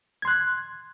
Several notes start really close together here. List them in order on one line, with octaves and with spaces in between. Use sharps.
G#6 C6 F#6